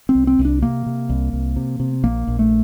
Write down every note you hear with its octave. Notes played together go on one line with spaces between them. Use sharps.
C4
C2
C4
C2
D4
C3 A#3
C3
C2
C2
C3
C3
A#1 A#3
A#1
A3